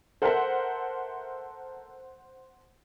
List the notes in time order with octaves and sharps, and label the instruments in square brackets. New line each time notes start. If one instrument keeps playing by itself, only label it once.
[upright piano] A4 A#4 E5 [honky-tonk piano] C5 F#5